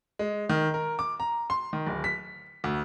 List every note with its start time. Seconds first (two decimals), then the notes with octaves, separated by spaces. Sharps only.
0.19 G#3
0.49 D#3
0.74 A#4
0.99 D6
1.20 A#5
1.50 C6
1.73 D#3
1.86 D1
2.04 B6
2.64 D2